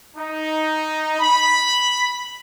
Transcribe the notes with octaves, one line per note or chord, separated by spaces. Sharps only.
D#4
B5